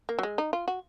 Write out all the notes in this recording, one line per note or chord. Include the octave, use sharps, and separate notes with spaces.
A#3
F#3
G#3
D#4
F4
F#4